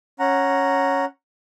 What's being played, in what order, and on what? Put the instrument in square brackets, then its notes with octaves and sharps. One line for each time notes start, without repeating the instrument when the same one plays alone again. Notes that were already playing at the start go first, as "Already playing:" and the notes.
[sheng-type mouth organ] C#4 F#5 A#5